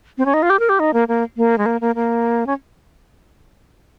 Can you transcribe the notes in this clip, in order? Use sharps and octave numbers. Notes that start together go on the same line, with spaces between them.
C4
C#4
D#4
F4
G4
A#4
G4
D#4
A#3
A#3
A#3
G#3
A#3
A#3
A#3
C#4